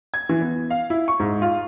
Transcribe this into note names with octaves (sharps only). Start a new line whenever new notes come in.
G#6
E3
B3
F5
E4
C#6
G#2
F4